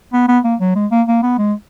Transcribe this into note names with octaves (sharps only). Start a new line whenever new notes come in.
B3
B3
A#3
F#3
G#3
A#3
A#3
B3
G#3